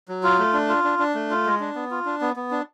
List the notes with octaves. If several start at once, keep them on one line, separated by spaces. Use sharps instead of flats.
F#3
F4
A3
D4
F4
D4
D4
A3
F4
G#3
D4
B3
F4
D4
B3
B3
D4